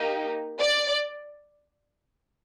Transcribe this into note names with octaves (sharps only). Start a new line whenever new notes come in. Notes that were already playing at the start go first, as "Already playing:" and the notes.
Already playing: A#3 D#4 G4
D5